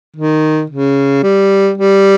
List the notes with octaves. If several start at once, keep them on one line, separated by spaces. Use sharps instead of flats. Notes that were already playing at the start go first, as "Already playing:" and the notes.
D#3
C#3
G3
G3